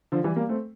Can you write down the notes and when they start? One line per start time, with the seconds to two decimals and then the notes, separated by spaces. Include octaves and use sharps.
0.12 D3 F3
0.24 E3 G3
0.36 G3 A#3
0.49 A3 C4